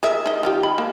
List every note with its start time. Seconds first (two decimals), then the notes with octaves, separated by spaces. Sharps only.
0.03 G#4 A#4 E5
0.26 D#4 D#5
0.43 D#3 F4 G4
0.63 B5
0.78 A#3